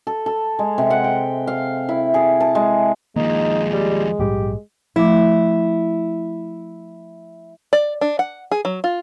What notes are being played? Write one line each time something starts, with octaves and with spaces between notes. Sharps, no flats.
A4
A4
G#3
C3
F#5
G5
F5
E4
G#4
A5
G#3
D#2 F3 G#3 A#3 D#4
G3
A#1 G#2 G3 G4
F3 A3 E4 D6
D5
D4
F#5
G#4
F#3
F4